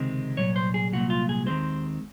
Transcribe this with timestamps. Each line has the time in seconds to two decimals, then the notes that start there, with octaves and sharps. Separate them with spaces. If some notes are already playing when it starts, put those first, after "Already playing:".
Already playing: C#2 C3 D#3 G#3 C4
0.37 C2 A#2 F#3 C#5
0.56 C5
0.74 G#4
0.92 C2 A#2 F#3 F#4
1.10 F4
1.29 G#4
1.46 D#2 D#3 G#3 C4 C5